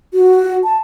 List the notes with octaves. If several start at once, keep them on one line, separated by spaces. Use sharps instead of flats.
F#4
A5